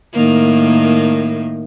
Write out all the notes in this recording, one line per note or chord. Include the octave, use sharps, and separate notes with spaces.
A2 D#3 A#3